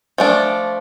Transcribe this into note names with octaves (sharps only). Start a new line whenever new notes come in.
F3 A3 D4